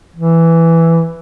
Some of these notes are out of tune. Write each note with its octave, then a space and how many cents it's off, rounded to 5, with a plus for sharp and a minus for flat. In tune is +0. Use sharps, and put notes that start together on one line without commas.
E3 +5